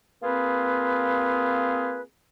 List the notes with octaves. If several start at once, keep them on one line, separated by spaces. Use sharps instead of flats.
A#3 C4 F4 G#4 B4